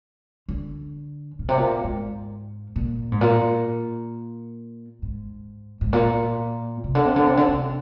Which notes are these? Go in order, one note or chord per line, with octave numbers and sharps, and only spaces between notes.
D3
A#2
C3
A#2
G#2
A#2
G#2
A#2
G#2
G#2
A#2
C3
D3
C3
D3
C3
D3
C3